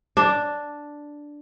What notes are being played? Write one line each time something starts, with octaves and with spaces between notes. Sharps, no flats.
D4